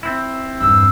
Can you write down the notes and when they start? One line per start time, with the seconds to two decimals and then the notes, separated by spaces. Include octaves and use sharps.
0.03 C4 E4
0.60 E2 G2 E6